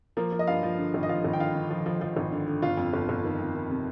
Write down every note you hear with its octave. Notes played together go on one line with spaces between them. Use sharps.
F3 A#3 A#4
F3
D#5
G2 F4 F5
F3
D3
G#1
D#5
F3 F4 F5
G#1
G5
D3 F4 F5
D3
F3
F3
F3
G#1
D3
D3
G1 F4 F5
F2
G1
G1
D#3
F2
D#3
C3